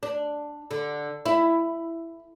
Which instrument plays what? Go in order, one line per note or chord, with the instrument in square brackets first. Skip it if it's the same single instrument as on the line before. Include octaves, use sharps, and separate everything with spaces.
[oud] D4
D3
E4